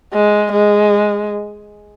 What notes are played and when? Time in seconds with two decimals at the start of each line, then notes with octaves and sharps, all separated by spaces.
0.13 G#3
0.52 G#3